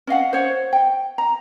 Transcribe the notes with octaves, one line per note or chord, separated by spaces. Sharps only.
C#4 D#5 F5 F#5
C5 C#5 F#5
G5
A#5